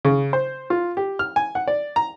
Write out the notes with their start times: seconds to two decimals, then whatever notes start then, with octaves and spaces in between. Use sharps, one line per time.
0.05 C#3
0.33 C5
0.70 F4
0.97 G4
1.19 F6
1.36 G#5
1.55 F#5
1.68 D5
1.96 A#5